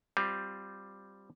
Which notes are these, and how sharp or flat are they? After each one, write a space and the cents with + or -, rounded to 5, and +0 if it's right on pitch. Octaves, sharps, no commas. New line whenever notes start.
G3 +0 C4 +0 F4 +20